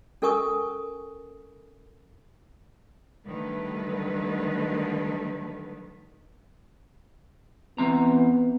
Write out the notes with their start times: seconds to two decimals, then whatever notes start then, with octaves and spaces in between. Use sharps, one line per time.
0.22 C#4 A4 A#4 G#5 C#6 D#6
3.27 D3 D#3 F#3 G3 A3 B4
7.78 E3 B3 C4 A#5